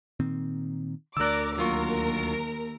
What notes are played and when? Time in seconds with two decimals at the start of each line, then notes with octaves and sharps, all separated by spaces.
0.20 A#2 D#3 C4
1.17 D2 D3 A#4 D5 D6 E6 F#6
1.58 D#2 F#3 F4 A#4 C#6